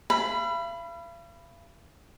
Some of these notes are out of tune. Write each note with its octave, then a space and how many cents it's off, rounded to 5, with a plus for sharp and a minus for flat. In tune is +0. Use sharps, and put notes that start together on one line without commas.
F5 -45 B5 +0